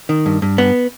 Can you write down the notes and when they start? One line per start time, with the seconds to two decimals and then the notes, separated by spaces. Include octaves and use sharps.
0.09 D#3
0.26 G2
0.42 G2
0.58 B3